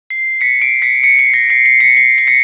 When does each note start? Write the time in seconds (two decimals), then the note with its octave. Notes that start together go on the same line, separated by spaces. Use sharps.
0.10 C7
0.41 B6 C#7
0.62 C7 D7
0.82 B6 C#7
1.04 B6 C#7
1.19 C7
1.34 A#6
1.50 C7
1.66 C7
1.80 B6 C#7
1.97 C7
2.18 C7
2.27 B6 C#7